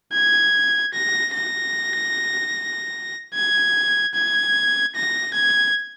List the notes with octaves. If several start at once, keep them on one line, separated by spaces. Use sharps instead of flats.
G#6
A#6
A#6
G#6
G#6
A#6
G#6